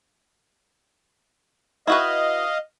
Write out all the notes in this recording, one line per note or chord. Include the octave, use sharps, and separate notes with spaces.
E4 F#4 B4 D#5 F5